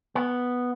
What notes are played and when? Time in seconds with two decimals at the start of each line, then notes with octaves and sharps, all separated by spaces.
0.15 B3